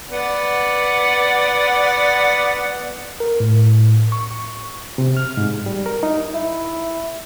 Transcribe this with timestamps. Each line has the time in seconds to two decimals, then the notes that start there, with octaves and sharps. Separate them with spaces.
0.11 B3 D5 F#5
3.20 A#4
3.40 A2
4.12 C#6
4.98 C3
5.17 F6
5.37 G#2
5.66 G3
5.86 A#4
6.03 D#4
6.34 E4